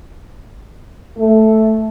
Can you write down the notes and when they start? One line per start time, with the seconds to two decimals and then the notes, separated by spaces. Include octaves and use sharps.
1.17 A3